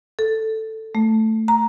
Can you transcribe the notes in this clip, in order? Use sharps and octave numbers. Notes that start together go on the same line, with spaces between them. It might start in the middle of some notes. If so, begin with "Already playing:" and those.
A4
A3
A#5